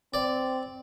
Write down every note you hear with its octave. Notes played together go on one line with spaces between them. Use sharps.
C4 D5